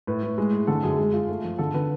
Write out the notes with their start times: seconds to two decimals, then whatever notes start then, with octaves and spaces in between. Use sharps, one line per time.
0.07 A2 B4
0.23 A2
0.38 G#3
0.52 A2
0.67 D3 A4
0.83 F#2 G#4
0.99 G#3
1.13 F4
1.29 A3
1.44 F3
1.58 D3 A4
1.74 D3 B4